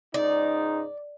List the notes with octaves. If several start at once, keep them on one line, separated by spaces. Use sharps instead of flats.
C#2 G#2 D#4 D5